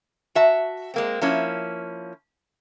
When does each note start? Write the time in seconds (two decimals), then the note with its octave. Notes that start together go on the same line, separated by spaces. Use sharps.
0.35 F#4 E5 A5
0.94 G#3 A#3 C4
1.21 F3 A#3 C#4 E4